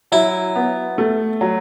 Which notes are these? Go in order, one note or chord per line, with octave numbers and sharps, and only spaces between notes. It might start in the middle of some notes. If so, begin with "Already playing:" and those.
F#3 E4
B3
A3
F#3